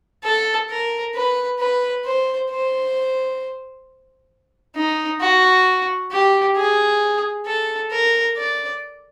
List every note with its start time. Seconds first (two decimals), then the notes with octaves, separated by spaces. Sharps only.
0.23 A4
0.70 A#4
1.15 B4
1.59 B4
2.05 C5
2.50 C5
4.76 D#4
5.21 F#4
6.12 G4
6.56 G#4
7.46 A4
7.91 A#4
8.37 D5